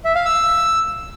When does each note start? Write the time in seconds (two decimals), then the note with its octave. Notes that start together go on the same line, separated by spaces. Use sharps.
0.05 E5
0.15 F5
0.25 E6